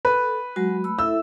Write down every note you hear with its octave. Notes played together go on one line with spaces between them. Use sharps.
A4 B4
F#3 G#3 F#4
A3 B5 E6
E4 A4 E5 E6